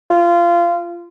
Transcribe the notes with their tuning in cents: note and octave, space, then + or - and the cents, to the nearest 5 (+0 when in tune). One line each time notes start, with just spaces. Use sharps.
F4 -20